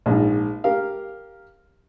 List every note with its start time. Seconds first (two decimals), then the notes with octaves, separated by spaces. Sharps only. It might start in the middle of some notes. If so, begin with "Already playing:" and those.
0.06 A#1 G#2
0.64 G4 A#4 F5